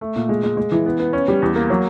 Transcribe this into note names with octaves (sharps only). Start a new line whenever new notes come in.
A3
A#2
G#3
G#3
G#3
E3
B3
B3
C#4
G3
E2
A#3
F#3